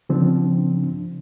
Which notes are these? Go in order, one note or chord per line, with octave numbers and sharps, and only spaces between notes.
C#3 F3 C4 D4